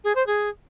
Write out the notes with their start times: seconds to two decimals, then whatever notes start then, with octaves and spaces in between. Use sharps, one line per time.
0.04 G#4
0.15 C5
0.26 G#4